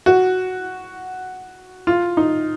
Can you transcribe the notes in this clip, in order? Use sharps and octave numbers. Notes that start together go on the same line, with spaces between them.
F#4
F4
D#4